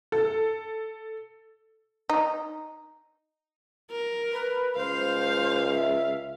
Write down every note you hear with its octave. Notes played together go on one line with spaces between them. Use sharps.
A4
D#4
A#4
B4
C#2 C5 F5
E5